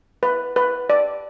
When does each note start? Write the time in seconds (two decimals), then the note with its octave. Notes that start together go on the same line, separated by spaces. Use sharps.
0.23 B4
0.56 B4
0.90 D5